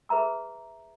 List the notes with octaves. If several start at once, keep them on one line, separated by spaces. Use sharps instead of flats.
G#4 B4 E5 A#5 E6